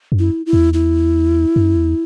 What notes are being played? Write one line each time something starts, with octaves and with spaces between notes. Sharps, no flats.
F#2
E4
E4
E2
E4
F#2
E2